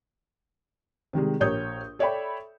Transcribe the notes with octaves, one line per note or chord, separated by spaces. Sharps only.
C3 D#3 G3 G#3
A#1 G4 A#4 C#5 D#6 G6
A4 C#5 D5 E5 G5 B5